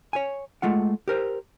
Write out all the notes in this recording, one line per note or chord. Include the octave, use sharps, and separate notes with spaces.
C#5 G#5
G#3 A3 F4 F#5
G4 A#4 C5